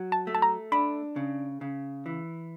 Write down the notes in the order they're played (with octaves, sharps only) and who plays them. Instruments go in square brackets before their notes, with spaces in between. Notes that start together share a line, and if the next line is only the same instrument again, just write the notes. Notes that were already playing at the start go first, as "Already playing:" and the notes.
Already playing: [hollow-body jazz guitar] F#3
[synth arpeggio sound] A5
[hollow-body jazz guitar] A3
[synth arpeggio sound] A5
A#5
[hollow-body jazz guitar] D4 [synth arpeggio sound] B5
[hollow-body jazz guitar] C#3
C#3
E3